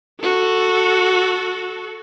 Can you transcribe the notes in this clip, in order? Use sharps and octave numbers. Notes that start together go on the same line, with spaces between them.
F#4 A4